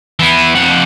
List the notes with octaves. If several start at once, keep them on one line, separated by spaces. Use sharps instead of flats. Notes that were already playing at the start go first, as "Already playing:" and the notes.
E3 B3
F2 F#5